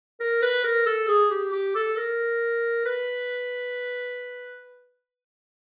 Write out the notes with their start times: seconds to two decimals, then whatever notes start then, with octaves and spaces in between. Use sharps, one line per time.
0.20 A#4
0.43 B4
0.64 A#4
0.86 A4
1.08 G#4
1.31 G4
1.52 G4
1.75 A4
1.97 A#4
2.86 B4